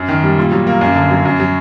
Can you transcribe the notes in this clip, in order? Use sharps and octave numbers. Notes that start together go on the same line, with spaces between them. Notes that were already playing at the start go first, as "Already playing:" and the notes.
Already playing: F#2
D#3
G3
A#2
F#3
A#3
F#2
D3
F#3
F#2
F#3